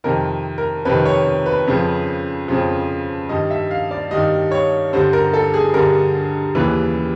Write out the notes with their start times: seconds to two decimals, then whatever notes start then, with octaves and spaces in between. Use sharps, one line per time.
0.04 F2 C3 D#3 A#4
0.58 A#4
0.85 F2 C3 D#3 B4
1.05 C#5
1.46 B4
1.67 F2 C#3 F3
2.48 F2 C#3 F3
3.29 G2 D#3 G3 D#5
3.51 E5
3.71 F5
3.91 D5
4.11 G2 D#3 G3 D#5
4.51 C#5
4.93 G2 D3 G3 C5
5.13 A#4
5.34 A4
5.54 G#4
5.74 G2 D3 G3 A#4
6.55 D#2 C#3 E3 G3 B4